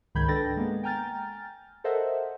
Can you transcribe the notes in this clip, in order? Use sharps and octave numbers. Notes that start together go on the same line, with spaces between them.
C#2 G#2 D#3 B5 G6 G#6
D4 A4 B4 G5 A6 A#6
G#3 A#3 B3
G5 G#5 A#5 F6 G6 A6
A4 A#4 C5 D#5 E5 F#5